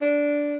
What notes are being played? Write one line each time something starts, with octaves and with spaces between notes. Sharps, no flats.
D4